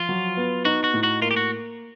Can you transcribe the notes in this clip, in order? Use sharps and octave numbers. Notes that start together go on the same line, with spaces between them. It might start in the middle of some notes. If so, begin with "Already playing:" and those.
Already playing: F3 F4
F#3
B3
D#4 F#4
F#4
A2
F#4
A#3 F4
G4
F#4